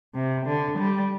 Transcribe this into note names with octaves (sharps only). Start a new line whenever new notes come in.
C3
D3
G3